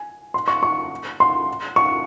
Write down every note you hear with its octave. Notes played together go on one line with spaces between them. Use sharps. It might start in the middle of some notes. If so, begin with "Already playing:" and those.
Already playing: G#5
C6
C#6
C#6
C6
C#6